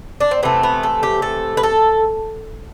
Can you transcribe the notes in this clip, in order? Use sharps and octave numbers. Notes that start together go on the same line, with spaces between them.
D4
C4
C3 E3 A3 B3
B3
A4
G4
A4
B4
A4